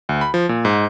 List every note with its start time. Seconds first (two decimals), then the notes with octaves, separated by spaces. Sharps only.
0.09 D2
0.21 B5
0.34 F3
0.49 A#2
0.65 G#2